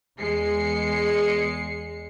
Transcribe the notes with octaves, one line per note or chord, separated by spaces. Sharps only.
E2 G#3 C7 C#7